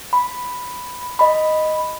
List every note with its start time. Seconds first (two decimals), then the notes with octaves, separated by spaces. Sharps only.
0.13 B5
1.19 D#5 B5